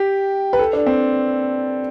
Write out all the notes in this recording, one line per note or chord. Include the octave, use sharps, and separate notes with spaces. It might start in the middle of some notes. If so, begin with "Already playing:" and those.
Already playing: G4
B4
A4
D4
C4